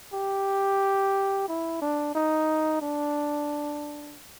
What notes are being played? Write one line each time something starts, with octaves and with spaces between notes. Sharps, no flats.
G4
E4
D4
D#4
D4